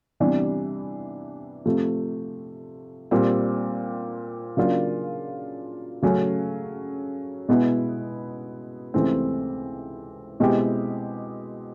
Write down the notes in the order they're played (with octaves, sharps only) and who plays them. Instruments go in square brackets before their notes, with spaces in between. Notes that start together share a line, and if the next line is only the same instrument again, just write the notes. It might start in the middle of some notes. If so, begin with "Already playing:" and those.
[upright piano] C3 E3 G3 B3 D4
C3 F3 A3
A#2 G3 C4
C#3 F#3 A#3 D4 F4
C#3 F#3 A3 C#4
B2 G#3 B3 E4
C#2 C3 E3 A3 C4
B2 G#3 C4 E4 G4